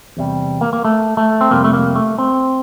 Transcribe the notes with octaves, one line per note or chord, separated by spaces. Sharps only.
E2 C3 G3
A#3
A#3
A3
A3
C4
F2 C3 G3 A#3
A3
A#3
A3
C4